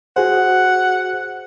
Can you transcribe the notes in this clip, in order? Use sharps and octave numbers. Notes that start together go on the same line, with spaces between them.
F#4 G#4 C5 F#5